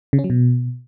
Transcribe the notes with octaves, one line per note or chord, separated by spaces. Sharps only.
C#3
C#4
F#3
B2